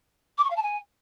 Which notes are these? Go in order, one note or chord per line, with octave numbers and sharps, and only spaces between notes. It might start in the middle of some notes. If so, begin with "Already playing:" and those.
D6
C#6
F5
A5
G#5